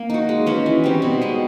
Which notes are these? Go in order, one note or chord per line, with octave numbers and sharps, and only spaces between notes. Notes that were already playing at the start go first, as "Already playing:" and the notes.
Already playing: A#3
D#4 F#4
G#3
C#4 F#4 B4
E3
G3 C4 D#4
B2
G#3 B3